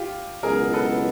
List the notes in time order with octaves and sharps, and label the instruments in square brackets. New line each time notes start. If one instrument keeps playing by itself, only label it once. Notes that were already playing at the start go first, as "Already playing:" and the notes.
Already playing: [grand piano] F4 G4
[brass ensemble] C#2 B2 F#3 B3 E4 [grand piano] G#4 A#4
[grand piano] A4 B4